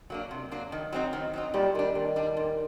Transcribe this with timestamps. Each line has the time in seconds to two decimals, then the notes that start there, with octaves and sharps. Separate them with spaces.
0.10 F#3 A#3 D4
0.31 C3
0.51 F#3 A#3 D4
0.72 D#3
0.93 F#3 C4 D#4
1.13 D#3
1.33 F#3 C4 D#4
1.54 A#2 G3
1.75 D#3 G3 D4
1.95 A#2 D#3
2.16 G3 D4
2.37 A#2